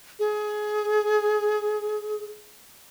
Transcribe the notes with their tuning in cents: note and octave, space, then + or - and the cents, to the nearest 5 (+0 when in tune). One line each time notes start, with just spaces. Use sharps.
G#4 +20